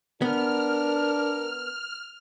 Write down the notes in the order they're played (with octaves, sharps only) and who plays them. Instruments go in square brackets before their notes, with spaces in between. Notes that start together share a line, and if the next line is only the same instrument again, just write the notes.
[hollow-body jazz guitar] B3 [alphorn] D4 [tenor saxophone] A#4 [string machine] F6